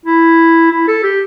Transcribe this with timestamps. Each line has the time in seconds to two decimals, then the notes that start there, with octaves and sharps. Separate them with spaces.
0.05 E4
0.72 E4
0.87 A4
1.03 G4